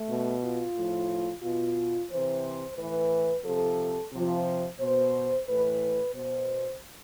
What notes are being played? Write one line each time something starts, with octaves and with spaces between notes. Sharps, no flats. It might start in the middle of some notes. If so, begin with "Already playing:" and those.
Already playing: A3
B2
F4
A2 F3
B2 F4
C3 E3 C5
A2 E3 B4
C3 F3 A4
C3 F3
B2 C5
A2 E3 B4
B2 C5